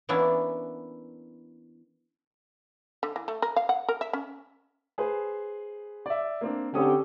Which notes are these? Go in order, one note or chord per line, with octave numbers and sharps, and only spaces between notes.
E3 A#3 B3 C#4 D4 E4
D3
E3
A3
A#4
F5
F#5
A#4
E5
C#4
G#4 B4 C5
D5 E5
A#3 C4 D4
D3 C4 C#4 G4 A4 D#6